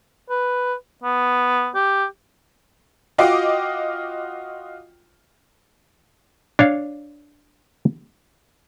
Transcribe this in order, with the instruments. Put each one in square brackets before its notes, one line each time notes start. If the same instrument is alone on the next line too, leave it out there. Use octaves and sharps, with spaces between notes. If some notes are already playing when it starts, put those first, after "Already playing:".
[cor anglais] B4
B3
G4
[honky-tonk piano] F4 F#4 D#5 F5 G5 D6
[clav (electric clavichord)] D4 C#5 F5